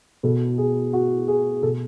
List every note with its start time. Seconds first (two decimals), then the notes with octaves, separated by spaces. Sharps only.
0.23 B2 A4
0.58 G#4
0.93 F#4
1.28 G#4
1.62 B2 A4